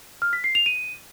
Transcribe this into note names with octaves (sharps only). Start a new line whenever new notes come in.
F6
B6
C7
F7
D#7